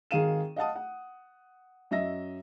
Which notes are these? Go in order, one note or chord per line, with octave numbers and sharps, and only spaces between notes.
G#1 D#3 G#4 F5 D#7 E7
D#5 F5 F#5 A5 D#6
F#5
F#2 D#5 E5 A#6